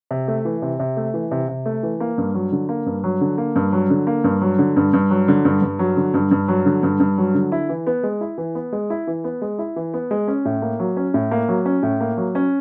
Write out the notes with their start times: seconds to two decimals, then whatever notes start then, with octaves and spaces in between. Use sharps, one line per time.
0.11 C3
0.28 A3
0.45 E3
0.62 C3
0.80 C3
0.97 A3
1.14 E3
1.31 C3
1.48 C3
1.66 A3
1.83 E3
2.00 A#3
2.18 G2
2.34 F#3
2.52 D3
2.69 A#3
2.86 G2
3.04 F#3
3.21 D3
3.38 A#3
3.56 G2
3.73 F#3
3.90 D3
4.07 A#3
4.24 G2
4.42 F#3
4.59 D3
4.76 G2
4.93 G2
5.11 F#3
5.28 D3
5.45 G2
5.62 G2
5.79 F#3
5.97 D3
6.14 G2
6.31 G2
6.48 F#3
6.66 D3
6.83 G2
7.00 G2
7.18 F#3
7.34 D3
7.52 E4
7.69 E3
7.87 B3
8.03 G#3
8.21 E4
8.38 E3
8.55 B3
8.73 G#3
8.90 E4
9.07 E3
9.24 B3
9.42 G#3
9.59 E4
9.76 E3
9.94 B3
10.11 G#3
10.28 C#4
10.45 A2
10.62 A#3
10.79 F#3
10.97 C#4
11.14 A2
11.31 A#3
11.48 F#3
11.65 C#4
11.83 A2
12.00 A#3
12.17 F#3
12.35 C#4